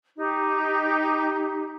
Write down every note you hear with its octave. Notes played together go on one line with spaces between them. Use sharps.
D#4 G4